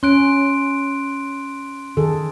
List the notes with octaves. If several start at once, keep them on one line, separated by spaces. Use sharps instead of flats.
C#4 C6 F#6 D7
D#3 G#4 A4